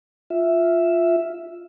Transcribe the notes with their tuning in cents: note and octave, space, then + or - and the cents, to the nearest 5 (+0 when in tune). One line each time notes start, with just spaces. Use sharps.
F4 +0 E5 +0